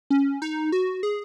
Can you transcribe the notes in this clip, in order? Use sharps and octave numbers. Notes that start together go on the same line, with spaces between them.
C#4
D#4
F#4
G#4